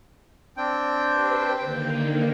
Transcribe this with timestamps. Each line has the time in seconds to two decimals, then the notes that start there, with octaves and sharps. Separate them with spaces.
0.57 C4 D4 G5
1.10 G4 B4 C5
1.59 D3 D#3 A#3 G5